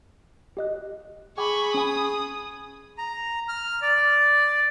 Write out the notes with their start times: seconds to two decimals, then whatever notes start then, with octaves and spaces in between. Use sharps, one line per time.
0.57 G4 D#5 F#6
1.38 G#4 G5 B5 C#6 D6
1.74 C#4 G#5 D#6
2.98 A#5
3.49 F6
3.82 D5